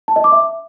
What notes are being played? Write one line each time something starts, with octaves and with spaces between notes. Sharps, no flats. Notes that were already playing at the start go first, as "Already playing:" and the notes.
A5
D#5
D6
E5